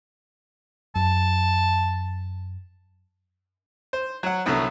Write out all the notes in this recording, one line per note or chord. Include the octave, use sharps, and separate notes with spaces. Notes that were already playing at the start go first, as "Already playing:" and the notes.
F#2 A5
C5
F#3 F#5
C2 D3 F#3 B3 B4